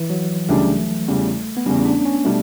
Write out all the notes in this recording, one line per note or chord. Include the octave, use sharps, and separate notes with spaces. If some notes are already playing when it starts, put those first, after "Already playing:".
Already playing: E3
F#3
C#2 C#3 G3 A3 D4 G4
E2 C#3 G3
B3
E2 C#3 G3 C#4
D4
C#4
B2 G3 A3 D4